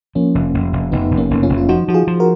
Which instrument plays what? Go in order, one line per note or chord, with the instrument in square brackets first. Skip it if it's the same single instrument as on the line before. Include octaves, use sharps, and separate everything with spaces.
[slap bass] F3 [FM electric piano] A#3 C#4
[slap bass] F1
F1
F1
[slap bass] F1 [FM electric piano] B3 D#4
[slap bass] F1
[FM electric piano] A#3 C#4
[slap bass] F1
[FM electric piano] C#4 F4
[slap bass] F1
[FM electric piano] F4
[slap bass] F3 [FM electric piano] D#4 F#4
[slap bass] F3 [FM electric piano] F#4
[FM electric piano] F4 G#4
[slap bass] F3
[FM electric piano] F#4 A#4